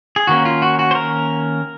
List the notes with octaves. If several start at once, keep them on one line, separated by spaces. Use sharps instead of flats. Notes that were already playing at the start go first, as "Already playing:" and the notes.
G#4
D#3 A#3 C#4 F#4
F4
F#4
F#4
C5
A#4